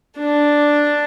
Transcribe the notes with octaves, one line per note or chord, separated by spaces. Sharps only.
D4